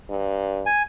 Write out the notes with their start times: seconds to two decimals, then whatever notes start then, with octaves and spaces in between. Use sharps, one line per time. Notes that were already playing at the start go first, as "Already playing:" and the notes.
0.10 G2
0.66 G#5